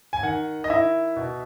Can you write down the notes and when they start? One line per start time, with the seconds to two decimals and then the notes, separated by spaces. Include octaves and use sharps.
0.13 G#5
0.23 D#3 F#5
0.64 D#5
0.70 E4 E5
1.16 B2